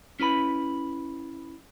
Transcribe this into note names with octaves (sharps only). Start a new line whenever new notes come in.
C#4 E4 B4 B5